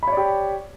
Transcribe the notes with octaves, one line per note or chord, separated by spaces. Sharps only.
G4 C#5 D5 B5